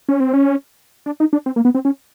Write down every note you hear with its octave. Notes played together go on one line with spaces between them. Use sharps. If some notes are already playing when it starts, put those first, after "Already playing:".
C#4
C4
C#4
D4
D#4
D4
C4
A#3
B3
C4
C#4